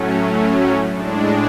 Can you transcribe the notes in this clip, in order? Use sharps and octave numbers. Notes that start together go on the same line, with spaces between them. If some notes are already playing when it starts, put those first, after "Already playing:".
Already playing: A2 F#3 A3 C#4
A2 G#3 D4